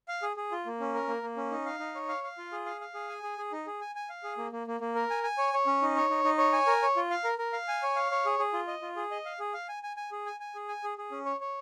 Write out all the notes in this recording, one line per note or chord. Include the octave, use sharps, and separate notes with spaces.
F5
G#4
G#4
F4
A#3
C#4
A#4
A#3
A#3
C#4
D#4
F5
D#4
C#5
F5
F5
F4
G#4
F5
F5
G#4
G#5
G#4
G#4
D#4
G#4
G#5
G#5
F5
G#4
A#3
A#3
A#3
A#3
A#4
G#5
G#5
C#5
C#5
C#4
D#4
C#5
D#4
D#4
C#5
G#5
A#4
C#5
F4
F5
A#4
A#4
F5
G#5
C#5
F5
C#5
G#4
G#4
F4
D#5
F4
G#4
D#5
F5
G#4
F5
G#5
G#5
G#5
G#4
G#5
G#5
G#4
G#5
G#4
G#4
C#4
C#5
C#5